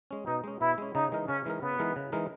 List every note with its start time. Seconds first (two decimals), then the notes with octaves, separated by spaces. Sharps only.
0.11 G#3 C#4
0.27 B2 D#4
0.44 G#3 C#4
0.61 B2 E4
0.78 G#3 C#4
0.95 C#3 D#4
1.12 E3 G#3 D#4 A#4
1.28 C#3 C#4
1.45 E3 G#3 D#4 A#4
1.62 C#3 B3
1.79 E3 G#3 D#4 A#4
1.96 C#3
2.12 E3 G#3 D#4 A#4